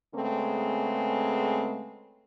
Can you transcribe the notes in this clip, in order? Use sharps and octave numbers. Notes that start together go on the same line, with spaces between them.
C#3 G#3 A3 B3 C4